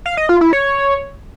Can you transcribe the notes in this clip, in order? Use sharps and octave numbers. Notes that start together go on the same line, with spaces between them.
F5
D#5
F4
E4
C#5